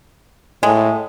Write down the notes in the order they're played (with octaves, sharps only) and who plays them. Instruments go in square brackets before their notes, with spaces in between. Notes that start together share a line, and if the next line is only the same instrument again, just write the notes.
[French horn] A2 [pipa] G#3